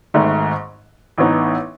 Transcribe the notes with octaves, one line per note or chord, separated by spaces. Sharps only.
G#1 G#2 D#3 A3
A1 A2 E3 B3 D#4